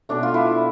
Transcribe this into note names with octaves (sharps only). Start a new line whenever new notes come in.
B2 A3 D4
F4
E4